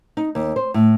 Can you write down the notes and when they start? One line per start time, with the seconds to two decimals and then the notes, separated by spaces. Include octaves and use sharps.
0.17 D#4
0.35 D#2
0.56 C5
0.74 A2